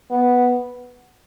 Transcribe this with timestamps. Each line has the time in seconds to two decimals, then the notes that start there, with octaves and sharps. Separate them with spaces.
0.11 B3